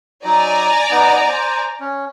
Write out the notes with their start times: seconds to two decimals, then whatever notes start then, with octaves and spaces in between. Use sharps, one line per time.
0.24 F#3 D#4 D5 G#5 A#5
0.91 B3 D#4
1.29 C5
1.80 C#4